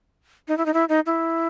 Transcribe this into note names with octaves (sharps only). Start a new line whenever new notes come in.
D#4
E4
D#4
E4
D#4
E4